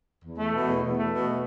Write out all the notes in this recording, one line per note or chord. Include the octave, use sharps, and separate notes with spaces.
E2
A3
B2
E2
E2
A3
B2